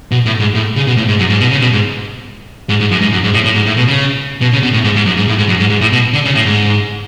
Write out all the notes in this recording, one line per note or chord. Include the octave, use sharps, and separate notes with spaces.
B2
A2
G#2
A2
C#3
B2
A2
G#2
F#2
G#2
B2
C#3
B2
G#2
G#2
G#2
F#2
G#2
F#2
G#2
A2
A2
G#2
A2
B2
C#3
B2
C#3
B2
A2
G#2
G#2
F#2
G#2
A2
G#2
F#2
G#2
G#2
A2
B2
D3
C#3
A2
G#2